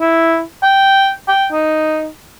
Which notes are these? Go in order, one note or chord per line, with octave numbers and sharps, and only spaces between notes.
E4
G5
G5
D#4